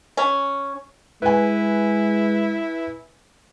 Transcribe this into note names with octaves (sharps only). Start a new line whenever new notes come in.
C#4
G#3 E4 B4 G#5